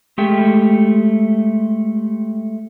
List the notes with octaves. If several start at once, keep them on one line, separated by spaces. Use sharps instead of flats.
G#3 A3 G4 G5